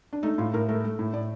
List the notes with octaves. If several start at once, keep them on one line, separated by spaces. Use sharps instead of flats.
D4
A3 D#4
A2 F4
A2 A#4
A3 A#4
A3
A2
A2 D5